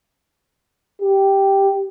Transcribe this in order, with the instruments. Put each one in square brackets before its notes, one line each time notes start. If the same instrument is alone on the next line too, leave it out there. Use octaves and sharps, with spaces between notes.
[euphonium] G4